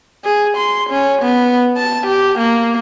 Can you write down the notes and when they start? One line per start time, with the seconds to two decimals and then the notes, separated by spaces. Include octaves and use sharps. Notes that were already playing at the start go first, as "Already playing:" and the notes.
0.25 G#4
0.57 C6
0.90 C#4
1.22 B3
1.77 A5
2.06 G4
2.38 A#3